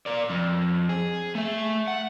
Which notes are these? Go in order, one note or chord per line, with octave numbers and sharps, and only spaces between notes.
A#4 D5
F2
G#4
A3 E5
F#5